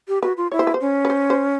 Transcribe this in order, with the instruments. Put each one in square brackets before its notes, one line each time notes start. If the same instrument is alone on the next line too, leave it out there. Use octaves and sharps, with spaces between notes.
[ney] G4
[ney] F#4 [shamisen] B4
[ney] F4
[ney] E4 [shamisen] C#5
[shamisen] C5
B4
C5
[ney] C#4
[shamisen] B4
C5
C5